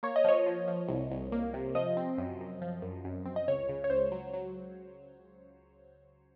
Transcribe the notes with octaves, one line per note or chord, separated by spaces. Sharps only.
A#3 C#5
D#5
F3 C#5
F3
F3
C2
C2
A#3
C3
F3 D#5
C4
F#2
F#2
F3
F#2
F#2
C4
D#5
C#2 C#5
C#3
C#5
C#2 C5
F#3
F#3